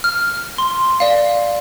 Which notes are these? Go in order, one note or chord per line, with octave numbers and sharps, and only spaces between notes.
F6
C6
D5 F5